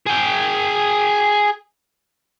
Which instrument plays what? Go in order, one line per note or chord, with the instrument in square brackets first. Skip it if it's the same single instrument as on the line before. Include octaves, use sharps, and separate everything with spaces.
[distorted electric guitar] G#4 G5